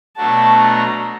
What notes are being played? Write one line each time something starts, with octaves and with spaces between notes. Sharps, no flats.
B2 F#3 A3 D4 F#4 A5
A#5